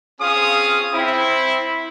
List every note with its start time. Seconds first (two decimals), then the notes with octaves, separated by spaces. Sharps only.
0.20 C4 C#4 F4 G#4 F5 D#6
0.93 C4 E4